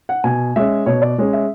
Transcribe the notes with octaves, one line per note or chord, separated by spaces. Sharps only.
F#5
B2 G#5
G#3 C#4 E5
B2 C#5
D5
G#3 C#4
E5